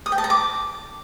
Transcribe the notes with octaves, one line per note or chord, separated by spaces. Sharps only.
D#6
G5
A5
A#5
D6